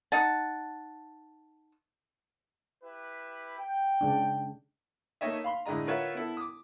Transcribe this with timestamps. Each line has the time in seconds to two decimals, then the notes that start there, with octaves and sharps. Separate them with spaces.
0.12 D#4 F#5 A5
2.83 E4 G4 B4
3.58 G5
4.01 C#3 G#3 D4
5.21 A3 A#3 D#4 C#5 D#5 E5
5.44 F5 B5 C6
5.66 A2 D3 G#3 D#5 A#5
5.87 F4 A#4 B4 C#5 E5 F#5
6.15 B3 E4 A4
6.37 D6 D#6